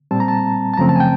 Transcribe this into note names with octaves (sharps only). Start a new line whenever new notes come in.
A#2 G3 C4 A5
A#5
A5
A5
F#2 C#3 F3 A3 C4 A#5
A5
G#5
G5